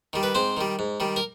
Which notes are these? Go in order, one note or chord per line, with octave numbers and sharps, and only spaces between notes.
D#3 G3
B4
G#2 C4 C5
D#3 G3
G#2
D#3 G3
A#4